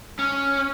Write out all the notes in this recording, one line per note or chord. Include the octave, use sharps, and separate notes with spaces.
C#4